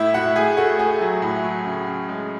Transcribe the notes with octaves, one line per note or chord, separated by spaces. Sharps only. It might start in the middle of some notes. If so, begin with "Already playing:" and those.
Already playing: A2 E4 E5
A2 F#4 F#5
A2 G#4 G#5
A3 F#4 F#5
A3 G#4 G#5
F#3
A2
F#3
C#3
C#3
G#3